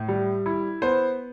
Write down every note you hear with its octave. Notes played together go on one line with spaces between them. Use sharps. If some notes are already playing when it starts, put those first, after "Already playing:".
Already playing: A2
G3
E4
B3 C5